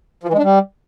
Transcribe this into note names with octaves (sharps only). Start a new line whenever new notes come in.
F3
E3
G#3
D4
G3